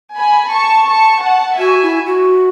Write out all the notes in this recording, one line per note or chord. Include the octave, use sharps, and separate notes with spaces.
G#5 B5
A5 C#6
A5 C#6
F#5 A5
F#4 E5 G#5
E4
F#4